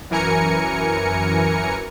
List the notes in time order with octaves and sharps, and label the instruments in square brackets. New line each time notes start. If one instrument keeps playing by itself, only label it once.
[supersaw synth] F#2 E3 A#4 G#5 A#5 C#7